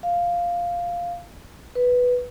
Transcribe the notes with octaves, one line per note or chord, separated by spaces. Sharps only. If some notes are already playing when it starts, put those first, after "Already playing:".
F5
B4